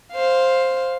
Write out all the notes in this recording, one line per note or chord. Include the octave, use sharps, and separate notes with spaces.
C5 F5